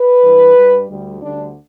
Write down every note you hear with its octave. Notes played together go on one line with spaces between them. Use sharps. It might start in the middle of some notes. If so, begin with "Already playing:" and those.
Already playing: B4
G2 E3 G3
G2 G3
D2 D3 G3
D2 D3 G3 D4